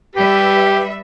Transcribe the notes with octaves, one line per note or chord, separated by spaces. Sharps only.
G3 G4 B4 E5